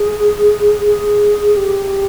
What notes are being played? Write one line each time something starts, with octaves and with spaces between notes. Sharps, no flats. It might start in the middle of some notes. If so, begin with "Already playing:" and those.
Already playing: G#4
G#4
G4